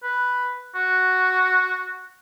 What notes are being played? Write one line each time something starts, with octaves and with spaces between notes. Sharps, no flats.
B4
F#4